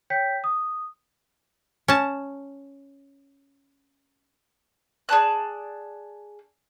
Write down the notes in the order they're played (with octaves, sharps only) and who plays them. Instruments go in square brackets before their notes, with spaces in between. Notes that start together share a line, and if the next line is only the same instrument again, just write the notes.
[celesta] C#5 G5 G6 B6
D#6
[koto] C#4 A5
[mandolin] G#4 D5 A5 F#6